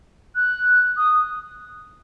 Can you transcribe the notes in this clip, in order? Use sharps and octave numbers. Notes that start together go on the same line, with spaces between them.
F#6
D#6